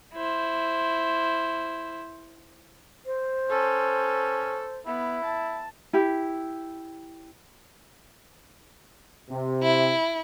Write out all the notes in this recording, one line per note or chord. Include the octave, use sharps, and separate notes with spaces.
E4 C5
C5
C#4 A4
B3 E4
A5
E4 G4
C3
E4